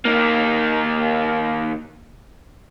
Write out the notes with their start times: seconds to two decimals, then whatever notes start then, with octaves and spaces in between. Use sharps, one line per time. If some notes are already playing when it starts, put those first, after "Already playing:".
0.05 D#2 A#3